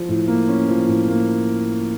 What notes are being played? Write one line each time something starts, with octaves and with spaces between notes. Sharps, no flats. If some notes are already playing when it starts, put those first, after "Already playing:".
Already playing: F3
A2
A#3
C#4
F3
A2
A#3